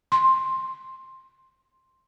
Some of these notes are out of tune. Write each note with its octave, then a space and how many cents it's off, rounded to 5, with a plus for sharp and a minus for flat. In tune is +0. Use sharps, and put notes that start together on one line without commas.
C6 +10